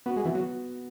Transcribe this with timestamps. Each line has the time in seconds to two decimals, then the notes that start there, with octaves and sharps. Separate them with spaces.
0.06 B3 F#4
0.16 G#3
0.25 E3 B3
0.35 F#3